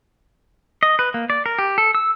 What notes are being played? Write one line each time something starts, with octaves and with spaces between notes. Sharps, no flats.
D#5
B4
A#3
D5
A#4
G4
A4
E6